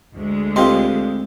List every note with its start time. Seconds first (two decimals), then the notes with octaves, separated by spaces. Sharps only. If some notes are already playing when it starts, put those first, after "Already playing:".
0.13 D2 G#3
0.56 C4 F4 G4 A4 D#5 C6